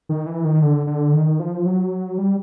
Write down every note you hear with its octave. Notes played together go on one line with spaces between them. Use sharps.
D#3
E3
D#3
D3
D3
D#3
F3
F#3
G3